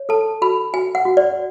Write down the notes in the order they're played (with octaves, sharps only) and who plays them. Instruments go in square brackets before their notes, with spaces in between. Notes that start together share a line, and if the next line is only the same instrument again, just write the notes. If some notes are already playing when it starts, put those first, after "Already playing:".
Already playing: [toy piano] C#5
A4 A5
F#4 B5
F#4 G#5
F#5
F#4
D5